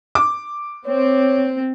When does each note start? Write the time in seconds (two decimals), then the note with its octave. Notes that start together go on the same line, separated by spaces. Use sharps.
0.15 D6
0.86 C4 C#5